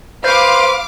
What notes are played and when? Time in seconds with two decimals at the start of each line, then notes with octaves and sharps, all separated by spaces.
0.24 B4 C5 F5 D6